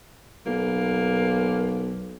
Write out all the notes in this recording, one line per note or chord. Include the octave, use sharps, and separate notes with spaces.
B1 A#3